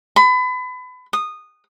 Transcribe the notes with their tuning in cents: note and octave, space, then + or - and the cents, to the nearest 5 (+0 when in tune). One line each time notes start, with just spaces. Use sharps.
B5 +30
D#6 -15